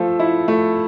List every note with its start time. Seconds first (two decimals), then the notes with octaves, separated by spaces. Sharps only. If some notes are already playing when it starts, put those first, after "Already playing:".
Already playing: F3 A3 A4
0.20 E4
0.48 A3